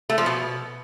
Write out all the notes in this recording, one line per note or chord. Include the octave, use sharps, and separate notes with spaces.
A3
F3
B2